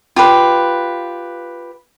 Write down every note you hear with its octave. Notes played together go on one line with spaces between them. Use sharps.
F4 G4 B4